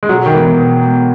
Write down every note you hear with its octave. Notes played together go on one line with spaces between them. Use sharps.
G#3
B2 F#3
D#3
E3 G#3 B3
B2
G#3 B3